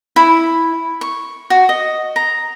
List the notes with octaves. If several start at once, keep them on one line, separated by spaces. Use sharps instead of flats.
E4
C#6
F#4
D#5
A#5